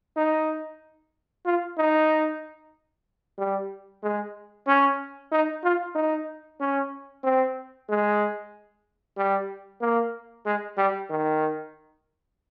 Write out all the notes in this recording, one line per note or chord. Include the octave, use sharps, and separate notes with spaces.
D#4
F4
D#4
G3
G#3
C#4
D#4
F4
D#4
C#4
C4
G#3
G3
A#3
G#3
G3
D#3